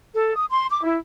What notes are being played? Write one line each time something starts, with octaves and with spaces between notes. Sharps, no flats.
A4
D#6
C6
D6
E4